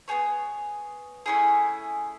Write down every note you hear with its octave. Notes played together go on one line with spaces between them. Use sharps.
B3 D#4 G#4 C#5
A3 C#4 E4 G#4